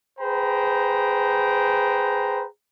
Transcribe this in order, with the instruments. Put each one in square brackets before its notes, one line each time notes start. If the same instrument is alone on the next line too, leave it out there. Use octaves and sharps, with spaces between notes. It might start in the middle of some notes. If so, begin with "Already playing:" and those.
[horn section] G#4 B4 C5 G5 A#5